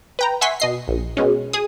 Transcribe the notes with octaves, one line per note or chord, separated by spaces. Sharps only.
B4 G5 A#5
E5 F#5 G#5 C6 C#6 B6
B2 D#5 C7
A#1
B2 G#3 C#4
G#4 D#6